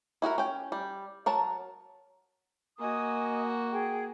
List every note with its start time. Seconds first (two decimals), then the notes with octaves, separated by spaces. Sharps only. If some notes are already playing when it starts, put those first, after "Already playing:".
0.22 E4 F#4 G#4 A#4
0.38 C#4 G5
0.72 G3
1.26 F#3 A#4 A5
2.79 A#3 F#4 D#5 G#5 D#6
3.70 G#4 G5